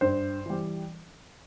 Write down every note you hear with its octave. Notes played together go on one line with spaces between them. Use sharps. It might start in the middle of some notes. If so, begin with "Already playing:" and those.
G2 C5
E3 G3